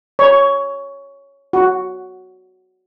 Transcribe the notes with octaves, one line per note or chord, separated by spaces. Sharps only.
C#5
F#4